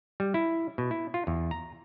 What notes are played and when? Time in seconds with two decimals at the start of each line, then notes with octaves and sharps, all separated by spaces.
0.20 G3
0.34 E4
0.78 B2
0.91 E4
1.14 F4
1.27 E2
1.51 A#5